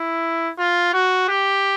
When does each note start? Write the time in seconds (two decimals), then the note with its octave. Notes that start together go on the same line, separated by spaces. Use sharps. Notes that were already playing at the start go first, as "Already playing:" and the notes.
Already playing: E4
0.58 F4
0.93 F#4
1.29 G4